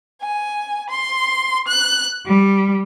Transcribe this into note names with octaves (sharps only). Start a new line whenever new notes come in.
G#5
C6
F#6
G3